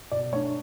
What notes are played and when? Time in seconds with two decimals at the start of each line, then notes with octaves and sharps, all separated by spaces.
0.12 B2 D5
0.33 A3 C#5
0.35 D4